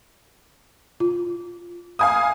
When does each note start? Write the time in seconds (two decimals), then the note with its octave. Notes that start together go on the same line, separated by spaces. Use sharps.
1.00 F4
1.99 F5 G#5 D#6